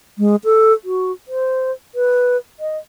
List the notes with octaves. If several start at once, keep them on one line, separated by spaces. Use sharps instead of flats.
G#3
A4
F#4
C5
B4
D#5